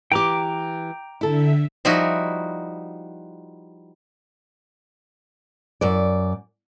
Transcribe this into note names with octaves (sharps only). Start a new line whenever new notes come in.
E3 G4 G5 A#5 D6
D3 E4 A4 E5
F3 G3 D#4 E4 F#4
F#2 D5